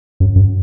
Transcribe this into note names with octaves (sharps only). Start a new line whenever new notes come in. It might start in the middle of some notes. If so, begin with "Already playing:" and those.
F#2
F#2